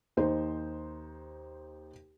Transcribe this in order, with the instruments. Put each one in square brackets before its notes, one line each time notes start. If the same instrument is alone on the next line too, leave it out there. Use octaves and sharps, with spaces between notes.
[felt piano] D#2 D#4 C5